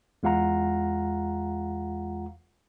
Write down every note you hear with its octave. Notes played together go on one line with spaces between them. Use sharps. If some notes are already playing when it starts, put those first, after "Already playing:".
E2 G#3 F4 F5 F#5 A#5